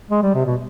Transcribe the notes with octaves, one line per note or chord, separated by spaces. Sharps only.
G#3
G3
C3
B2